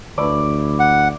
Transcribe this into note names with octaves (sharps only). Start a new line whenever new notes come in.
D2 E4 D5
F#5